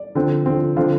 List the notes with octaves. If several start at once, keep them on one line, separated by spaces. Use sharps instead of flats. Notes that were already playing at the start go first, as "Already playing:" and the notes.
Already playing: D5
D3 F3 C4
D3 F3 C4
D3 F3 C4 F5